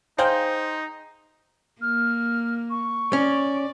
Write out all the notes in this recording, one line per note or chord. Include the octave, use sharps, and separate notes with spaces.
D#4 G#4 C5 F5 G5
A#3 F6
C#6
C#4 D5